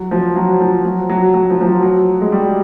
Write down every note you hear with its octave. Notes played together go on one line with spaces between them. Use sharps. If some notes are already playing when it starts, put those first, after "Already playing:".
Already playing: F#3
F3
F#3
F3
F#3
F#3
F#3
F3
F3
F#3
F#3
G#3
G3